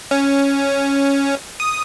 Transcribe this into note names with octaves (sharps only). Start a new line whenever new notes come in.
C#4
D#6